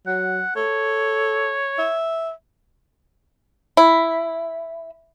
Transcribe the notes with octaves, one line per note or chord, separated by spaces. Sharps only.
F#3 F#5
A4 C#5
E5
E4